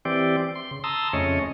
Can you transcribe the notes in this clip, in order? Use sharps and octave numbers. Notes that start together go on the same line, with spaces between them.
E3 C4 G4 D5
C6
C#3
A5 A#5 C6 D#6 E6
F2 C#3 A3 C#4 C#5 D#5